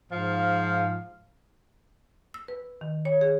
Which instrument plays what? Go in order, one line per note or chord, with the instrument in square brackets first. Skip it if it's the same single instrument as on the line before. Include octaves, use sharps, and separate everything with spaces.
[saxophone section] G#2 F3 F5
[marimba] E6
B4
D#3
C#5
G#4